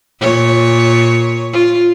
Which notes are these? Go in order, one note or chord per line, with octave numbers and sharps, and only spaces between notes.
A#2 C#5
F4